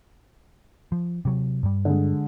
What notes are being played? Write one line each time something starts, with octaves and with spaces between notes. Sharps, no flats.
F3
C3 F#3
G2 G3
D3 G#3